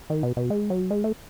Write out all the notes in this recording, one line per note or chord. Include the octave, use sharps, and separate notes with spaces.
D#3
B2
B2
G#3
F#3
G#3
A3